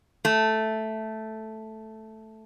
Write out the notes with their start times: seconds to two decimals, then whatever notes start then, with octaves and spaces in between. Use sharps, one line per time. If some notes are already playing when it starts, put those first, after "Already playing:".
0.25 A3